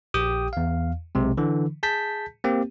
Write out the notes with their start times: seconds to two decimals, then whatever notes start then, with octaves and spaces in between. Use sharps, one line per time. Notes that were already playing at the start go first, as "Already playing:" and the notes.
0.14 A#1 G4 G5 D#6
0.53 E2 F5
1.15 B1 C3 G#3
1.37 D3 E3
1.83 G#4 A5 G6 B6
2.44 A#3 C4 G4